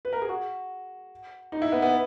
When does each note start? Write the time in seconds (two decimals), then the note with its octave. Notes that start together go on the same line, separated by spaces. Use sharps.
0.05 B4
0.13 A#4
0.22 G#4
0.29 F#4
1.52 D#4
1.62 E4
1.72 B3
1.82 B3